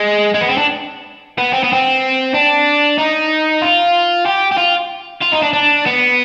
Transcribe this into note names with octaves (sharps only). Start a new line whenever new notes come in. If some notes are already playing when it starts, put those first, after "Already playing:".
Already playing: G#3
G#3
B3
C4
D4
B3
C4
B3
C4
D4
D#4
F4
G4
G4
F4
F4
D#4
D4
D4
B3